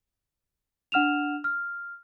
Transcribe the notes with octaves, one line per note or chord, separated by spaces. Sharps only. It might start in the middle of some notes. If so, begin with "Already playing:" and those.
D4 F#5 F6 E7 F7
F6